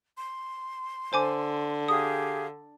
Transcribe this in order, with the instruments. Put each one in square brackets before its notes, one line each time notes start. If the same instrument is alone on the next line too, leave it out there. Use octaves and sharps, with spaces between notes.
[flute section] C6
[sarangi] D3 [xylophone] C5 G#5 D6
[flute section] G4 G#4 F5 [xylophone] D#6